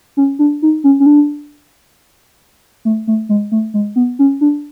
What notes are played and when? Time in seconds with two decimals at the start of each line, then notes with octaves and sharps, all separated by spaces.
0.17 C#4
0.39 D4
0.62 D#4
0.84 C#4
1.00 C#4
1.06 D4
2.85 A3
3.07 A3
3.29 G#3
3.52 A3
3.74 G#3
3.96 B3
4.19 C#4
4.41 D4